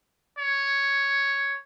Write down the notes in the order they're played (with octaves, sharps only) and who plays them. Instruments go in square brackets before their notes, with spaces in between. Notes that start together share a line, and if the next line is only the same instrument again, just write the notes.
[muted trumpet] C#5